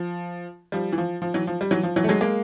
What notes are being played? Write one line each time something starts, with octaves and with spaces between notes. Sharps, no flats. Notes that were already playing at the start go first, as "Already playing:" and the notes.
Already playing: F3
F3 G3
E3
F3
F3
E3 F#3
F3
G3
E3 F#3
F3
E3 F#3
A3
F#3 G#3
G#3 A#3